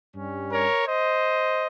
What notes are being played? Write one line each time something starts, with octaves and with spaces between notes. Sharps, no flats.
G2 G3 C#4
A#4 C#5
C5 D#5